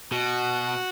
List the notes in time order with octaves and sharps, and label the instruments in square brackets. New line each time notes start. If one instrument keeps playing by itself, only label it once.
[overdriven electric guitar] B2 [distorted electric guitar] F#4